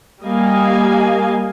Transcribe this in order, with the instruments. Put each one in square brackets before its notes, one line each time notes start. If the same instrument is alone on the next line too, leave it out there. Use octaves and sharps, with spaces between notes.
[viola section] G3 A#3 D#5 F5 G#5